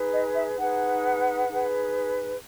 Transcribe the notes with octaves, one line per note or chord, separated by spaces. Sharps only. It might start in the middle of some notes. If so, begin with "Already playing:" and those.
Already playing: D#4 G#4 B4
D#5
E5
D#4 G#4 B4 F#5
D#4 G#4 B4